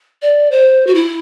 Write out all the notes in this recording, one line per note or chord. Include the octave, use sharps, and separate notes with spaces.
D5
C5
F#4
E4